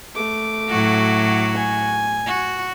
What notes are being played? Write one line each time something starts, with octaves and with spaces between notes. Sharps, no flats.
A3 D6
A2 F#3 F#4
G#5
F#4